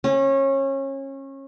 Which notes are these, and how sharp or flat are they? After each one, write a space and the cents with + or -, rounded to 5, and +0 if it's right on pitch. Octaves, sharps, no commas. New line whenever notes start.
C#4 -25